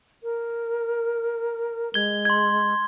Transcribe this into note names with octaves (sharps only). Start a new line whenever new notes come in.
A#4
G#3 G#6 G7
C6 G#6